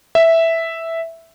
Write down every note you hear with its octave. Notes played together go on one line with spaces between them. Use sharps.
E5